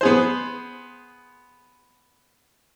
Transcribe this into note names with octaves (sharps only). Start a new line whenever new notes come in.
B3 G#4 C5